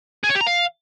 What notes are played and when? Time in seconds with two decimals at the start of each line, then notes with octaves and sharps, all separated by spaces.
0.24 G#4
0.30 C#5
0.35 G4
0.41 A#5
0.47 F5